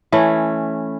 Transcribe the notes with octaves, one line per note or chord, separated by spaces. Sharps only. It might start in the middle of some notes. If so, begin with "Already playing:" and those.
E3 A3 C#4